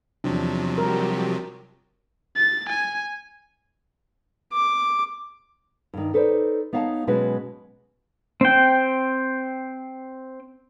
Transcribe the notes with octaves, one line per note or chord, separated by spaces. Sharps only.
E2 C3 F3 F#3 D4
G3 F#4 G4 A#4
A6
G#5
D6
G2 D#3
D#4 A4 B4 C5 D5
B3 D#4 C#5 F5 G#5 A5
B2 F#3 G#3 C#4 F#4 B4
C4 G5